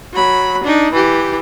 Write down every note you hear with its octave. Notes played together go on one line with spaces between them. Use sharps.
F#3 B5
D4 D#4
E3 G4